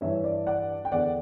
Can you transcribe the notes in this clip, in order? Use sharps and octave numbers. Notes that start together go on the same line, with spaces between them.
G2 E3 C#5 E5
D5
D5 F#5
G5
E2 D3 D5 F#5